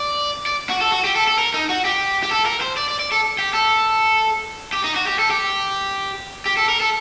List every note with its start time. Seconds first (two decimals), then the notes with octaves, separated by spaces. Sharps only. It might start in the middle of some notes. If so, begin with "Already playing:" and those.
Already playing: D5
0.46 D5
0.69 F#4
0.81 A4
0.92 F#4
1.04 G4
1.16 A4
1.27 A4
1.38 A#4
1.54 D#4
1.69 F#4
1.85 G4
2.23 G4
2.31 A4
2.46 A#4
2.61 C5
2.77 D5
2.89 D5
2.99 D5
3.12 A4
3.39 G4
3.54 A4
4.73 G4
4.84 D#4
4.96 F#4
5.07 G4
5.19 A4
5.30 G4
6.46 G4
6.57 A4
6.69 A#4
6.80 A4